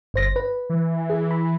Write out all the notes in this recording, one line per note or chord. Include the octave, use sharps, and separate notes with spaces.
G1 C5 A#6
B4
E3
G#4
B5